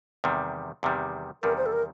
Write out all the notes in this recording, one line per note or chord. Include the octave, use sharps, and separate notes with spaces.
E2 C3 D#3 G3
E2 C3 D#3 G3
E2 C3 D#3 G3 A#4
C5
A4
A#4